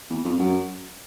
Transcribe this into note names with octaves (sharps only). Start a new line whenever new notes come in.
E2
F2
F#2